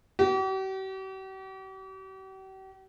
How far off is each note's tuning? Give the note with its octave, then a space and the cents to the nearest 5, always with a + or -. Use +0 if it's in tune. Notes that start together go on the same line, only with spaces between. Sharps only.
G4 -45